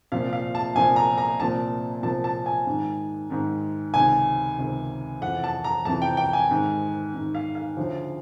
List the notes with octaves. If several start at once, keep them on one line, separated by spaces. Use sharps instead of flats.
C2 A#2 F3 F5
F5
A5
C2 A#2 F3 G#5
A#5
A#5
C2 A#2 F3 A5
C2 A#2 F3 A5
A5
G#5
G#2 D#3
G#2 D#3
C#2 C3 D#3 G#5
C#2 C3 D#3
F2 C3 E3 F#5
A5
A#5
F2 C3 E3 A5
G5
G5
G#5
G#2 D#3
G#2 D#3
F5
F5
D2 C#3 F3